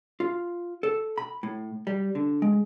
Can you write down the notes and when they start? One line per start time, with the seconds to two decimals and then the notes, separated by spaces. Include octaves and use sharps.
0.20 F4
0.83 A4
1.18 B5
1.43 A2
1.87 G3
2.15 D3
2.42 G#3